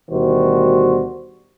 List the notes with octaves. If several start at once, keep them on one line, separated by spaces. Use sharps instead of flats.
D2 B2 D#3 G3 F#4 C5